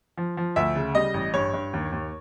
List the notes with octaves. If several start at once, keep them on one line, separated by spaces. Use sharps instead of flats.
F3
F3
D2 E5
C#3
G3 D#5
A1
G2 C#5
G2
D#2
D#2